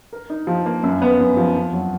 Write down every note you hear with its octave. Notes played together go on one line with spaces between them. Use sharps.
A#4
D#4
F3
A#3
F#2
B3
F#2
F3
F2
F#3